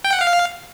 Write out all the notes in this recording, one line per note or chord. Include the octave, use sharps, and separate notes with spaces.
G5
F#5
F5